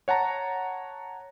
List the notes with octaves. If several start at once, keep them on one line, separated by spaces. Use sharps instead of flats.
C#5 F#5 A5 A#5